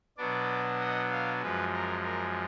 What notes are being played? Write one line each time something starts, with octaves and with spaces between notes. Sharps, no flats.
B2 F#3 B3 D4 D5
D#5
F5
F#2 F3 G#3 B4
A#4
A#4